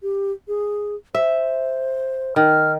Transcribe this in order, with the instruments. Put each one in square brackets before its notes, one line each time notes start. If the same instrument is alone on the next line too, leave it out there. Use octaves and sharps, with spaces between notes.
[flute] G4
G#4
[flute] C5 [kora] E5
[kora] D#3 [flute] F6